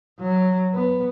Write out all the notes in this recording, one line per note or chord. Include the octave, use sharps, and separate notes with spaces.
F#3
B3